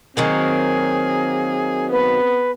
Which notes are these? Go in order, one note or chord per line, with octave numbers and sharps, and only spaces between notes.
D#3 F#3 A#3 C4 G#4
B3 B4